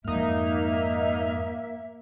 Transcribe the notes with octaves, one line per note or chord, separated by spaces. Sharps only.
F2 G#2 A#3 D#4 E5 F6